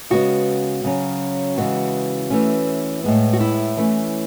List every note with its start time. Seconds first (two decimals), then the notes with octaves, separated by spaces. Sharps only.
0.10 C#3 G#3 B3 F#4
0.84 C#3 F#3 C#4
1.57 C#3 E3 G#3 B3 F#4
2.30 E3 A3 C#4
3.04 A2 G#3 B3
3.33 F#4
3.40 E4
3.77 E3 A3 C#4